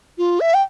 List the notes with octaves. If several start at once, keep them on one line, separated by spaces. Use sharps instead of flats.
F4
E5
G5